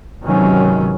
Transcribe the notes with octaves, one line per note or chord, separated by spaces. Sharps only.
G#1 C3 D#3 E3 F#3 C#4